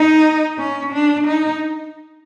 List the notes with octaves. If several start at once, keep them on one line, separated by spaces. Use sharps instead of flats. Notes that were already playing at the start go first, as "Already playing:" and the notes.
Already playing: D#4
C#4
D4
D#4